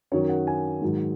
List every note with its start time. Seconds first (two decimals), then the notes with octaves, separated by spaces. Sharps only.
0.12 F#2 D#3 F#3 C#5
0.29 F#5
0.47 G#5
0.81 G#2 D#3 F#3